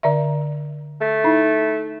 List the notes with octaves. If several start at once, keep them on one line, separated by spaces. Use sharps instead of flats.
D3 D5 E5
A3
D#4 E4